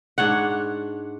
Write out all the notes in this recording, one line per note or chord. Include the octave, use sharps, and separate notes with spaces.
G#2 D4 C#5 F#5